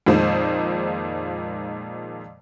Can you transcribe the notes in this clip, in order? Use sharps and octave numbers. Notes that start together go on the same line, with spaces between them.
F2 A#2 D#3 G#3 C5